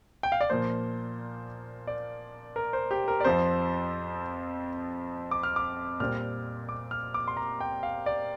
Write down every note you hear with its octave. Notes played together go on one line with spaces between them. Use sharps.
G5
F5
D5
A#2 F3 A#3 C5
D5
A#4
C5
G4
A#4
D5
F2 F3 C4 C5
D6
F6
D6
A#2 G3 C4 F6
D6
F6
D6
C6
A#5
G5
F5
D5